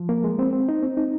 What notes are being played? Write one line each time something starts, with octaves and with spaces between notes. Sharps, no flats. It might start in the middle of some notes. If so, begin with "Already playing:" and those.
Already playing: F3
A#3
G#3
C4
C4
D#4
C4
D#4